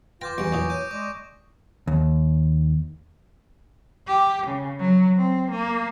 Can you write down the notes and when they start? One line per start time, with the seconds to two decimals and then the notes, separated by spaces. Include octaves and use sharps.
0.21 F4 B4 G5 D6 G6 A#6
0.38 E2 G2 E3 C#6 D7
0.52 F#2 A#2 E4 C#6 D#6 G6
0.70 C#5 G6 D#7
0.91 G#3 D5 D6
1.88 D#2
4.07 G4
4.47 C#3
4.80 F#3
5.18 C4
5.51 A#3